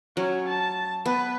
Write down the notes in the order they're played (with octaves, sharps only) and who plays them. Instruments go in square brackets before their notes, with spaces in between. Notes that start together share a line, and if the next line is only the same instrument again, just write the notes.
[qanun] F#3 [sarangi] C#4
[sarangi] A5
[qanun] B3 [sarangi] B4